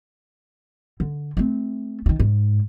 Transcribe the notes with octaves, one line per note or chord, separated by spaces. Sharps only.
D3
A3 C4
D#3 F3
G#2